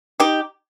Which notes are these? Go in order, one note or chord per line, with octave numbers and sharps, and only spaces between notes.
D#4 G4